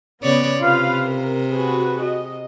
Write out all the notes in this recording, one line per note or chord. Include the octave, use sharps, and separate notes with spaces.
C#3 B3 C#5 D5
C3 F4 B4 F5
A#4
F#4 G#4 B4
D#5